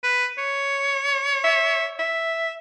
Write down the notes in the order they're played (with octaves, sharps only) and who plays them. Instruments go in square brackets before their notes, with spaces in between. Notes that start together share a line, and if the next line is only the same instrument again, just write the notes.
[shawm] B4
C#5
[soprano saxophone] E5
E5